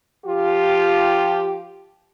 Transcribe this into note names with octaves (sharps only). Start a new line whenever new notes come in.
F3 F4 G4